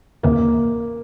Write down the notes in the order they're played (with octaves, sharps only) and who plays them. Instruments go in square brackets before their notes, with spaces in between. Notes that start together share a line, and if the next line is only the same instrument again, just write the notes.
[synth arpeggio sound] D#2 C#3 E3 [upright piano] A#3